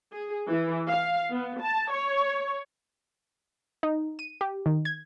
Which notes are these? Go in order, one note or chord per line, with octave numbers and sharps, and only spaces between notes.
G#4
E3
F5
B3
A5
C#5
D#4
D#7
G4
D#3
G#6